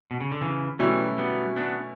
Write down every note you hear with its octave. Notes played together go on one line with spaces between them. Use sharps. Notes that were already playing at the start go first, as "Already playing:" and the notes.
B2
C#3
D3
C#3 E3
B2 E3 F#3 G3 A3 C#4 E4
G3 B3
B3 D4